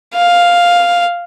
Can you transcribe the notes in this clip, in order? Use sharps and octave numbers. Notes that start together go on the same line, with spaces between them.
F5